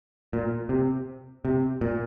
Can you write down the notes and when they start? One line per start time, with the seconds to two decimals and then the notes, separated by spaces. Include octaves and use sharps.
0.33 A#2
0.69 C3
1.45 C3
1.81 A#2